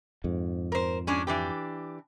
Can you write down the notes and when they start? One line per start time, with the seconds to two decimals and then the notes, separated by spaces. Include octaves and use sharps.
0.24 F2 G#2
0.72 A#4 C5
1.07 G#3 C#4 D4
1.27 E3 D4 G4